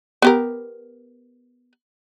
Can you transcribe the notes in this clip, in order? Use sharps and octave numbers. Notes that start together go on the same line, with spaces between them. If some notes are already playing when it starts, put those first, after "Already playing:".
B3 G4 A#4